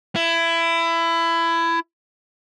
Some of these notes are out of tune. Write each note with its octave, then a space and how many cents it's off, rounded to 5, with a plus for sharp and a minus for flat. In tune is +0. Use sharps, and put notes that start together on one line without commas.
E4 +20